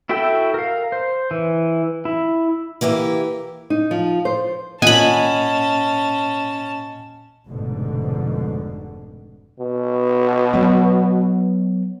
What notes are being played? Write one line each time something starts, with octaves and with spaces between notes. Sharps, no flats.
E4 F#4 A4 E5 G5
A#4 F5
C5
E3
E4
E3 A#3 E4 G4
D#4
F3
C5
A#2 C#4 D#5 F#5 G#5 A5 B5
F1 G#2 B2 D3
B2
F#3 B3